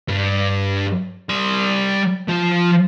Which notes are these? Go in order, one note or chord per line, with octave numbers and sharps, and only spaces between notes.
G2
G3 C6
F3 F4